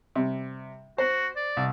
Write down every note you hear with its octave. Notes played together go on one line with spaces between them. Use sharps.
C3 G3
F#4 C5
D5
C2